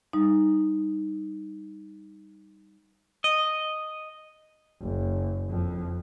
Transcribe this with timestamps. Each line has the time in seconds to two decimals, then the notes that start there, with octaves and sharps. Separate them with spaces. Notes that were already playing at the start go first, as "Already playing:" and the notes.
0.13 G3 D#4
3.24 D#5
4.82 F#1
5.50 F2